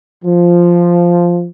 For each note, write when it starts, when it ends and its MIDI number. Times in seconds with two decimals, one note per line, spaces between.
0.25 1.47 53